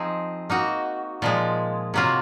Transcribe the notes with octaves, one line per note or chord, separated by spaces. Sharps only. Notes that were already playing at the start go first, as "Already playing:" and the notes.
Already playing: F3 C4 D#4 G#4
A#3 D#4 F#4
A#2 F3 G#3
C3 F#3 A#3 F4